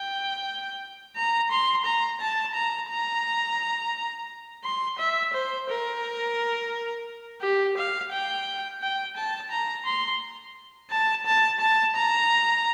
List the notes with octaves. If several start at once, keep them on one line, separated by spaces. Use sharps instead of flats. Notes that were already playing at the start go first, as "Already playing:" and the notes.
Already playing: G5
A#5
C6
A#5
A5
A#5
A#5
C6
E5
C5
A#4
G4
F5
G5
G5
A5
A#5
C6
A5
A5
A5
A#5